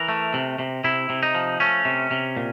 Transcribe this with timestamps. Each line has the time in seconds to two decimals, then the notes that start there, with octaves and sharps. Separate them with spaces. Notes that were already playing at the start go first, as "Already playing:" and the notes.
Already playing: E3 A#4
0.09 A3
0.34 C3
0.59 C3
0.84 C3 E4
1.10 C3
1.23 D#4
1.35 F3
1.60 A3 C#4
1.85 C3
2.11 C3
2.37 A#2